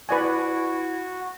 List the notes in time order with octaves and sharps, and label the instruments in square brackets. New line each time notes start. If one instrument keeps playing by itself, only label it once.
[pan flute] E4 [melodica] F#4 [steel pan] B4 D5 G#5